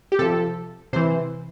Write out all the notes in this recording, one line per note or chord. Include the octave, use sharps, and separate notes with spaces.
G4
C3 F3 A4
C3 E3 C5